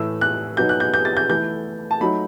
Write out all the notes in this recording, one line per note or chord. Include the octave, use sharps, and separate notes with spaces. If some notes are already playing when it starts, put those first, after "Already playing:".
Already playing: A2 E3 A3 E6
F#6
B2 F#3 B3 D#4 G6
F#6
G6
G6
A6
G6
E3 A3 E4 G6
A5
F#3 A3 D#4 B5